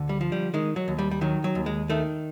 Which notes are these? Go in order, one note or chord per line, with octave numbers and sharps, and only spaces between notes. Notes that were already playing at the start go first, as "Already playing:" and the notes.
Already playing: D2 D3
G3
F3
G3
D#3 G#3
F#3
D#2
G3
G3
D#3 F#3
F#3
D#2
G#3
D#3 A3